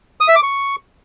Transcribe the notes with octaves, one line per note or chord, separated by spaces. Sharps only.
D#6
E5
D6
C#6